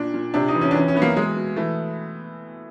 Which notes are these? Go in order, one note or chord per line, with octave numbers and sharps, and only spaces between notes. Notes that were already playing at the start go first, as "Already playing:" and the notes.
Already playing: A#2 D4
A#2
C3 D4
D#4
E3
C#4
D4
E3 C#4
C#4
E3 B3
A#3
B2 G#3
B2
E3 A3